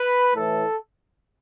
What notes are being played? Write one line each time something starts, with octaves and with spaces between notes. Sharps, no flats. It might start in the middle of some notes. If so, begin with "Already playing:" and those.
Already playing: B4
A2 E3 A4